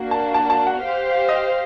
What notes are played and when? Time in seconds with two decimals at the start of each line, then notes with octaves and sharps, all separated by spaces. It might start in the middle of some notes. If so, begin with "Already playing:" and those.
Already playing: A#3 D4 F#4
0.11 A5
0.34 A5
0.50 A5
0.67 F#5
0.81 G4 C5 F5
1.29 D#5